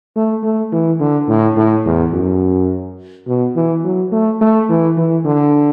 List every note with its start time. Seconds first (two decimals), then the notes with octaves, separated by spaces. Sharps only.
0.16 A3
0.43 A3
0.72 E3
1.00 D3
1.28 A2
1.56 A2
1.85 E2
2.13 F#2
3.27 B2
3.55 E3
3.84 F#3
4.12 A3
4.41 A3
4.69 E3
4.97 E3
5.25 D3